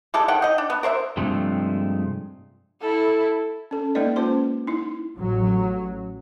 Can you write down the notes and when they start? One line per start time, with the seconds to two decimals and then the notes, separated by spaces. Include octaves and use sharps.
0.14 G3 G#3 A4
0.28 D#3 F#5 G5
0.42 D#4 D#5
0.58 D4
0.70 B3
0.83 A#4 C5 C#5 E5
1.17 G2 C3 F3 G#3 A3
2.81 E4 A4
3.71 C#4 A4
3.95 G#3 A#3 D#4 B4 D5 D#5
4.16 A#3 C#4 F4 C5 C6
4.67 D#4 E4
5.18 A1 F#3